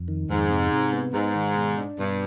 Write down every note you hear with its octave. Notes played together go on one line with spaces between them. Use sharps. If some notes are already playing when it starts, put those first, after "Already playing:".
Already playing: F2
D#3
F2 G#2
C3
C3
B3
G#2 D#4
D#3
B2
D4
G2 B2